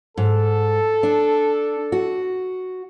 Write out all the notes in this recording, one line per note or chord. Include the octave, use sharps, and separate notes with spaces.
G#2 A4
D4
F#4